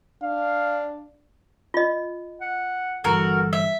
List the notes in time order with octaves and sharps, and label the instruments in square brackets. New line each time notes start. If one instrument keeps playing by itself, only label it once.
[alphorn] D4 [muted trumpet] F5
[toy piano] F4 D#5
[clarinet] F#5
[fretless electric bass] G1 G2 E3 [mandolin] F#4 A#4 [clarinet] A4
[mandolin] E5